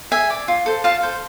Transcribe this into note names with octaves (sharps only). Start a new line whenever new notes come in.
G#4 E5 G#5
D5
F4
A4 C5
F4 F5 A5
A4 C5